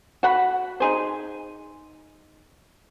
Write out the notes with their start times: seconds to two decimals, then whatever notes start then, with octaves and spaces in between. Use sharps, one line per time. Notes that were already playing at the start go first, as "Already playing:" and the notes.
0.23 F#4 F#5 B5
0.80 D#4 G#4 C5